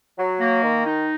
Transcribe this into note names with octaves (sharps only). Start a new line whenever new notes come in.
F#3
A#3
D#3
D#4